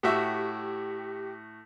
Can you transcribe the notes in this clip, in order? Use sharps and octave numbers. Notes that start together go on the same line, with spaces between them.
A2 F#4 G4 E5